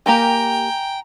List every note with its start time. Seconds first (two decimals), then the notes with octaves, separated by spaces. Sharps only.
0.06 A#3 G4 A#4 G5 G#5 A#5